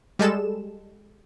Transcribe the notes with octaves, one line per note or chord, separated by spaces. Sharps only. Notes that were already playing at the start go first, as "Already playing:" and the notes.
G3 G#3 A4 E7